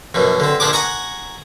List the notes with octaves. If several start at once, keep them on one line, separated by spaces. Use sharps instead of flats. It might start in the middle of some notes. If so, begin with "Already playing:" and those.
A#1 F#2 B2
D3 C4
A#1 F3 D4 G#4 D6
F#5 G#5 A#5 C#6